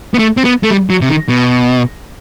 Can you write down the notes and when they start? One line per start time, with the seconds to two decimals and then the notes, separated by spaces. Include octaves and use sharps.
0.14 B3
0.19 A3
0.37 C4
0.45 B3
0.63 A3
0.71 G3
0.90 F#3
1.02 C3
1.09 D#3
1.29 B2